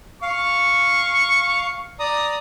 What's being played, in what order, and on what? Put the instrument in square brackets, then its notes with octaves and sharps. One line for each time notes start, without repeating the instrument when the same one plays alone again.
[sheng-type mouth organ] F5 [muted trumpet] C#6
[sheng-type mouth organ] D5 A#5 D#6